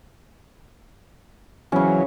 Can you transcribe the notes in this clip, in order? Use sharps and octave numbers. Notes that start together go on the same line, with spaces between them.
C#3 E3 F#3 C#4